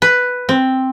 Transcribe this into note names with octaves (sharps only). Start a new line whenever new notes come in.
B4
C4